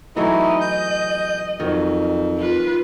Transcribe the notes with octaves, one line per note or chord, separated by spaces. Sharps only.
E3 F#3 A3 D#4 E4 D#5
G6
F2 D#3 F#3
F4 B4